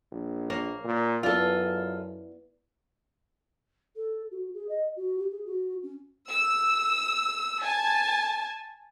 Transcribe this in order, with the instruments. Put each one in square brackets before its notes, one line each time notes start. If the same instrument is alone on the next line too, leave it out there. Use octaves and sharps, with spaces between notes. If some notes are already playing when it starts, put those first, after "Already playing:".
[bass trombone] A#1
[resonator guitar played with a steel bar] A#3 [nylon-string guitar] C#5
[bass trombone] A#2
[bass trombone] F#2 [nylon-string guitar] B3 E4 D5 [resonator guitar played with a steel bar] F4 A4
[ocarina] A4
F#4
G#4
D#5
F#4
G4
G#4
F#4
C#4
[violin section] E6
G#5 A5